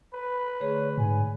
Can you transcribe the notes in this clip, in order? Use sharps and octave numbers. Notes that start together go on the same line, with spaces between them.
B4 B5
D3 A3 G#4 C#5
G#2 G#5